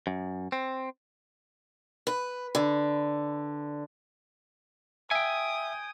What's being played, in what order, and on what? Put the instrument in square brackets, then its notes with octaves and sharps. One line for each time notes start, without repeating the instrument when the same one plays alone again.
[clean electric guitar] F#2
C4
[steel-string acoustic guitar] B4
D3
[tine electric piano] E5 [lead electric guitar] G5 G#5 [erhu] D#6